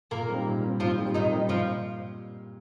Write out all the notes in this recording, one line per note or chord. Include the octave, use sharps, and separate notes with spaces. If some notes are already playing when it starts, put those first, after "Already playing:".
A#2 A#3 A#4
G3 C4 D#4 G4
A#2
G3 C4 D#4 G4
A#2 F3 F4
G3 C4 D#4 G4
A#2 D#3 D#4
G3 C4 D#4 G4
A#2 F3 F4